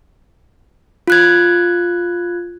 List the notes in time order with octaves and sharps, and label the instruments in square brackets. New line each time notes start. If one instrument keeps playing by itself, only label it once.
[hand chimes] F4 F#6 G#6